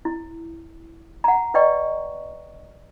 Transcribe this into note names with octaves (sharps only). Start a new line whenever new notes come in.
E4
F#5 A#5
B4 D5 D#5 G5 C#6